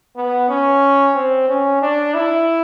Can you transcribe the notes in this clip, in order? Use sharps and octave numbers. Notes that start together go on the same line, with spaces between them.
B3
C#4
C4
C#4
D4
E4